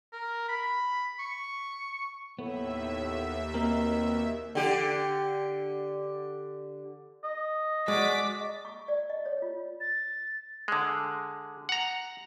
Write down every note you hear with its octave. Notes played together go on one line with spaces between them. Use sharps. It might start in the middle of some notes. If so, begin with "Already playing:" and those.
A#4
B5
C#6
D#2 A2 B3 E5
B2 A#3 C4 A#4
D3 G4
D#5
G#3 F#4 D5 D6 B6
D#5
C#6
D5
D#5
C#5
F4
A6
D3 G#3
F#5 A#5